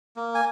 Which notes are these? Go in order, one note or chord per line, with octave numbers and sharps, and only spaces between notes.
A#3
G#5